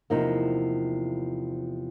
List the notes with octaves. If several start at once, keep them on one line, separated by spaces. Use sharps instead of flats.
E2 C3 F3 A#3 D#4